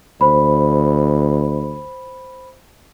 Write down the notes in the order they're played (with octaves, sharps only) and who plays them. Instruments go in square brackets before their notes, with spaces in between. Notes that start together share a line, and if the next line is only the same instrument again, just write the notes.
[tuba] D2 [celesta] C5 B5